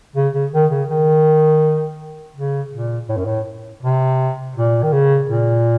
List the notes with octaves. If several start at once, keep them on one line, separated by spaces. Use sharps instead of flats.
C#3
C#3
D#3
C#3
D#3
C#3
A#2
A2
F#2
A2
C3
A#2
D#3
C#3
A#2